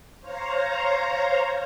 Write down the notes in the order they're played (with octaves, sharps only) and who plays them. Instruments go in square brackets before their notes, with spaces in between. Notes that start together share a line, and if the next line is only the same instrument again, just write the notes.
[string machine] C5 C#5 F5 A#5